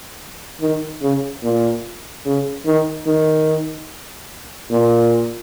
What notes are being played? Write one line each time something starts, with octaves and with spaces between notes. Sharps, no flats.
D#3
C#3
A#2
C#3
D#3
D#3
A#2